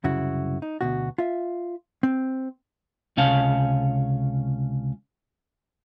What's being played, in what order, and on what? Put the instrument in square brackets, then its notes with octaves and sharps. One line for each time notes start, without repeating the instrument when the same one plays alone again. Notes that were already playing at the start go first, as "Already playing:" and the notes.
[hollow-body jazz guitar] C2 F#2 C#3 E4 F#4
D#4
D2 B2 F#4
F4 E5
C4
[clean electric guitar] C#2 C3 C#4 C#5 F5 A5